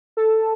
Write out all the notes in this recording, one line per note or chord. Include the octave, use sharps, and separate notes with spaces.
A4